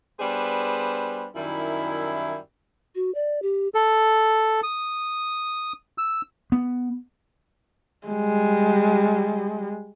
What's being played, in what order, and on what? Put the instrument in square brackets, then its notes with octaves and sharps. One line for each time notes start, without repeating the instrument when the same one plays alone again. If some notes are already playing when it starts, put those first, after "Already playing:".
[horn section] G3 B3 D4 G#4 B4 C5
F#2 D#3 G3 E4
[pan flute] F#4
D5
G4
[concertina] A4
D#6
E6
[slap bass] B3
[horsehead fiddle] G3 G#3